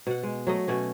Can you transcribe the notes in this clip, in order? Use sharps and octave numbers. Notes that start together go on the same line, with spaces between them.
B2 F#5
G#3
F#3 A3 D#5
B2 A3 C#4